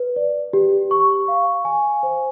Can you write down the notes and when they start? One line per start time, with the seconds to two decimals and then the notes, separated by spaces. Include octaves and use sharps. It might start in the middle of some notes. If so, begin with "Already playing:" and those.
Already playing: B4
0.16 D5
0.53 G4
0.91 C#6
1.28 F5
1.65 G#5
2.03 C5